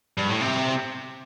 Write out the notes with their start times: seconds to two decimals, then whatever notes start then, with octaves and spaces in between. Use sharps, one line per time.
0.17 G2
0.29 A2
0.41 C3